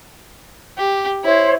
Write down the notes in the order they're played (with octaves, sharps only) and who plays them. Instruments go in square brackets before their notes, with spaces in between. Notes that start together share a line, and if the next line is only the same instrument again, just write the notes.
[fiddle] G4
[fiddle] E4 [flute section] C5 C#5